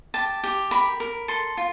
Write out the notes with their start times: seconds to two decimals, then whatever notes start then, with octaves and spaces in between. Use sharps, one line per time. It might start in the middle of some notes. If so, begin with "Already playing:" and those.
0.14 G4 A5
0.44 G4
0.71 A#4 B5
1.00 A#4
1.28 A4 C6
1.57 F4